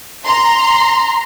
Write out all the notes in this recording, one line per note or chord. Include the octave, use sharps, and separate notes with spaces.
A#5 C6